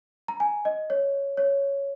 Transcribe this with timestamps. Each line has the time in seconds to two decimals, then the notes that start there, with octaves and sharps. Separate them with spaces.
0.28 A#5
0.40 G#5
0.65 D#5
0.90 C#5
1.37 C#5